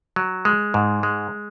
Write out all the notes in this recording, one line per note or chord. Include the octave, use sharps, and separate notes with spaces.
F#3
G#3
G#2
G#3